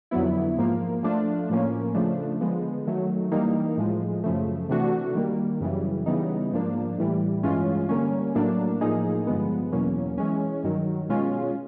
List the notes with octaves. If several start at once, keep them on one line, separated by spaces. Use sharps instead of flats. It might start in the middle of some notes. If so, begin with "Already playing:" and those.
F2 D3 F#3 B3 E4
G#2 F3 A#3
F3 A3 D4 F4
A2 F3 A#3 C#4
C#3 F3 A3 D4
D3 F3 G#3 B3
D#3 F#3 A3
E3 G3 A#3 D#4
A2 F3 G#3
F#2 C#3 F3 A3
C3 E3 A3 D4 F#4
D#3 G3 A#3
F#2 C#3 E3 G3
C#3 E3 G3 B3 D#4
G#2 F3 A#3 D4
A2 E3 G3
G2 E3 G#3 C#4 F4
D3 G3 A#3 C#4
A2 F#3 A#3 D4
A2 F3 A#3 D#4 G#4
G2 D3 F3 G#3 B3
E2 B2 F#3 A#3 C#4
E3 G#3 C#4
G2 D#3 F#3
B2 G#3 C#4 F4